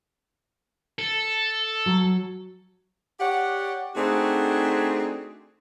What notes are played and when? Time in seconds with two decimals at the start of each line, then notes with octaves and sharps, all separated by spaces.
0.99 A4
1.86 F#3
3.19 G4 C#5 D5 F#5
3.95 A3 C4 D4 D#4 F#4 G#4